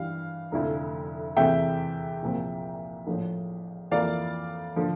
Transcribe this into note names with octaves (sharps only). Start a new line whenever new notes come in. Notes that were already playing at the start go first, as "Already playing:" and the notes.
Already playing: G2 E3 G3 F5
F1 F2 D3 A3 E4
E2 C3 E3 A3 C4 E5 G5
C2 A#2 F3 C4
A#1 A2 F3
F2 E3 A#3 F4 D5 F5
D3 F3